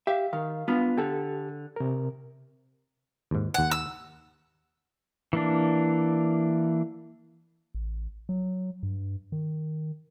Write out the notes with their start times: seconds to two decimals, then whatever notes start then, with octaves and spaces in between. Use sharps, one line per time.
0.07 G4 E5 F5
0.33 D#3 F5
0.68 B3 D4 F4
0.98 D3 G4 A4
1.76 C3 A#4
3.31 D#2 G#2
3.54 D#2 F#5 G#5
3.71 E6
5.33 E3 A#3 D4
7.74 A1
8.29 F#3
8.83 G2
9.32 D#3